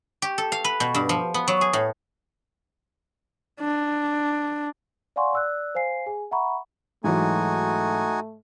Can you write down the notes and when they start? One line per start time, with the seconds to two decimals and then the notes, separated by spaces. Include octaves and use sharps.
0.22 G4
0.38 A4
0.52 F5
0.64 B4
0.80 B2
0.95 G2
1.09 F3
1.34 B3
1.48 F#3
1.61 G#4
1.73 A2
3.60 D4
5.16 D5 F5 F#5 G#5 C6 C#6
5.33 D5 E6 F#6
5.75 C5 F5 G#5 C7
6.06 G#4 G#5
6.31 E5 F#5 A#5 B5 C#6
7.04 G#2 E3 F#3 A3 D#4 F#4 G#5